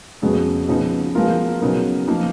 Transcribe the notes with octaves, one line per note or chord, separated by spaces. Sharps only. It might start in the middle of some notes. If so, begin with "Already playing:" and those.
F2 C#3 G#3 B3 F#4
C#3 F3 B3 D#4
F3 G#3 B3 F4 A#4
C#3 F#3 B3 D#4 A#4
F3 A#3 D#4